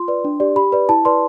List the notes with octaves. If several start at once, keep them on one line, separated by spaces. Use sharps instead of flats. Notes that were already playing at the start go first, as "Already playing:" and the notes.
Already playing: F4 C6
B4 D5
D4
G4 D5
G4 B5
B4 D5
E4 A5
B4 D5 C6